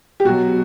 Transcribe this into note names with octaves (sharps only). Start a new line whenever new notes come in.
G4
B2 F#3 F#4